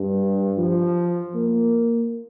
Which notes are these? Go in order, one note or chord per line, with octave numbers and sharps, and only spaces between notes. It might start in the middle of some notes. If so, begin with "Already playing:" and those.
Already playing: G2
F3
A#3